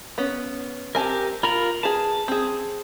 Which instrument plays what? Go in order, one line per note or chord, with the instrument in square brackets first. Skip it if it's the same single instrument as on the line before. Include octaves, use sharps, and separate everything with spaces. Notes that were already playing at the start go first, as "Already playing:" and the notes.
[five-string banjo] B3 C#4
[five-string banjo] C4 G#5 A5 [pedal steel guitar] G4 A#4
[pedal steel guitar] F4 A#4 A#5 [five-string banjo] B5
[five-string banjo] G#4 B4 [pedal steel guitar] A5
[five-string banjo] C4 G#4